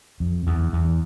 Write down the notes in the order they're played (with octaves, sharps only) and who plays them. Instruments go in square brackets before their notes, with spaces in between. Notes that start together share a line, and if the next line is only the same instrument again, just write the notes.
[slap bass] F2
E2
E2